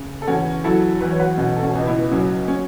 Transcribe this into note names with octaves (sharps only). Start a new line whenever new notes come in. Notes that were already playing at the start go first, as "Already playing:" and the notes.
Already playing: C#3
A4
E2 C#4 F#4
F#3 E4 A4
E2 B4
C#5
F#4 B4
B2 C#4 F#4
A4
C#4 F#4
C#2
B3 E4
F#3 C#4
C#4